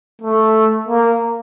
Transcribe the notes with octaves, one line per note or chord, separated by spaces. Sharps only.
A3
A#3